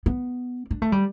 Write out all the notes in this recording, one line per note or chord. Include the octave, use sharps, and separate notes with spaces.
B3
D4
A3
G3